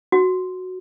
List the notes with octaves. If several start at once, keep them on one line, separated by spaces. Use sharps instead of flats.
F#4